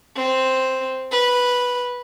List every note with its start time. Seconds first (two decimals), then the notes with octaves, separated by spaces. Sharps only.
0.16 C4
1.11 B4